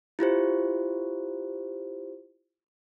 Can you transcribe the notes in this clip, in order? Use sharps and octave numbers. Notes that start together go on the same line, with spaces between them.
E4 F4 G4 C5